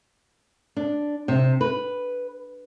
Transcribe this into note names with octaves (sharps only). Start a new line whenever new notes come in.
D4
C3
B4